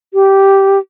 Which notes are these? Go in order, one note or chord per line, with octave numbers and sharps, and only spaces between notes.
G4